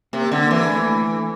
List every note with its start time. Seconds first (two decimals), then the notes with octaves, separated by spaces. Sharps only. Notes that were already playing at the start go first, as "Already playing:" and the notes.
0.13 C3 A#3
0.25 C4
0.32 D3
0.38 A#3
0.51 E3
0.69 A3